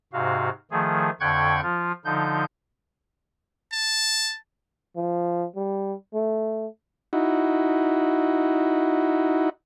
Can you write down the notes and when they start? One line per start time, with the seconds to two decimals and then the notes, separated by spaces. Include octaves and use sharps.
0.13 G#2 C3 F#4 F5
0.71 D#3 F3 A3 G#4
1.20 F2 D3 G5 C#6 F#6 G#6
1.63 F3 F4
2.05 D3 F3 D#4 G6
3.73 A5
4.96 F3
5.56 G3
6.14 A3
7.13 D#4 E4 F#4